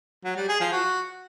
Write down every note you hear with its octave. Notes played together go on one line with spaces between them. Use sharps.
F#3
G3
G#4
F3
F#4